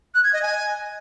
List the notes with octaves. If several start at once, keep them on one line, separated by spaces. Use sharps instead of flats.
F#6
G#6
D#5
G#5